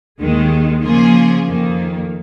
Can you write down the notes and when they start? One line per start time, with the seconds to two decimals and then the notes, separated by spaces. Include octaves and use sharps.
0.20 D#2 D#3 G#3
0.83 C#3 F3 A#3 F4 G#4
1.47 F2 D#3 A#3